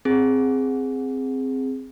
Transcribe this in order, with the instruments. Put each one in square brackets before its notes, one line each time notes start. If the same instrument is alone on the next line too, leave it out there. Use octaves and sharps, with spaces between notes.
[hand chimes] C4 G#4